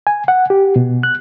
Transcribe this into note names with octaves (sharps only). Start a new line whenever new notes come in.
G#5
F#5
G4
B2
F#6